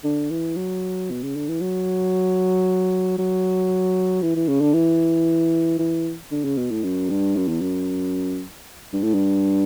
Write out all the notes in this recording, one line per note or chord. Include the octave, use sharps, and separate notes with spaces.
D3
E3
F#3
B2
C#3
D3
E3
F#3
F#3
E3
E3
C#3
D3
E3
E3
D3
C#3
B2
A2
F#2
G2
F#2
E2
F#2
G2
A2
G2